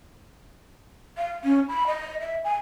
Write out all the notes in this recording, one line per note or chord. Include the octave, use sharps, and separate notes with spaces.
F5
C#4
B5
D#5
E5
G#5